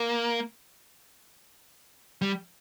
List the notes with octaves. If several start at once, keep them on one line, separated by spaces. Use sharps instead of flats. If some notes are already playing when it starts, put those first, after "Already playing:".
Already playing: A#3
G3